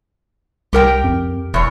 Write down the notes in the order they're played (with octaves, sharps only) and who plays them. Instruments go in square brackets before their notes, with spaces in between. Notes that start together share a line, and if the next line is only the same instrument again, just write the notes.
[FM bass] C2 [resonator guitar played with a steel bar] G4 A#4 G5
[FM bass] F2
[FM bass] E1 [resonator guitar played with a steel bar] E2 C#5